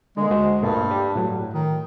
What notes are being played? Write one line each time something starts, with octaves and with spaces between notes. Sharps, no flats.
D3 G#3 A#3
D2 F#4 C5
G2 A#2 A3 A#3
G4 D5
A2 F#3
D#3